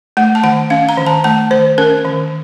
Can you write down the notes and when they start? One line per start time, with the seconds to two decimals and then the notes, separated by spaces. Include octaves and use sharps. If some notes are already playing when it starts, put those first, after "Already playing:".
0.17 A3 F#5
0.35 A5
0.43 D#3 F#5
0.70 C#4 F5
0.89 A#5
0.97 D#3
1.06 A5
1.24 A3 A5
1.51 D#3 C5
1.78 C#4 A#4
2.05 D#3